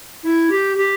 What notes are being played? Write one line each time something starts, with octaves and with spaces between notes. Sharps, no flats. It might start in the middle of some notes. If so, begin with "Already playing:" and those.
E4
G4
G4